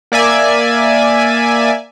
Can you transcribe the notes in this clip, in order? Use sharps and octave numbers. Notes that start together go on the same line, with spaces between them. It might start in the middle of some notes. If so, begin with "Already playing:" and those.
A#3 D5 E5 G#5